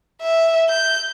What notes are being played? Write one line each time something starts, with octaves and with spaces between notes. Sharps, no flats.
E5
G6